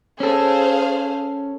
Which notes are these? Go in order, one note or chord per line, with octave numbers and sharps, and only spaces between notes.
C#4 G#4 A4 C5 F5